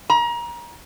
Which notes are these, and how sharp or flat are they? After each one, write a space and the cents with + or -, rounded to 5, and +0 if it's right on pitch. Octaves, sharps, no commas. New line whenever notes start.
A#5 +30